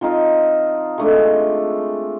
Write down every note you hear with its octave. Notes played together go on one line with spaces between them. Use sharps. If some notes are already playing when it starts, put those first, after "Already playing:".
F3 C4 D#4 F4
G#3 A3 D4